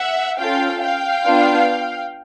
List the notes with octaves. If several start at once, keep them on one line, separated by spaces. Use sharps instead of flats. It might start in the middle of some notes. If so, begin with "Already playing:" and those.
Already playing: E5 F#5
C#4 F4 A4 F5 G5
F5 G5
B3 D4 F4